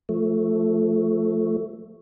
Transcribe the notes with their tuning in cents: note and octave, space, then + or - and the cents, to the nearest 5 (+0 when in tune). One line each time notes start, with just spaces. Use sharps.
F3 +0 A3 +0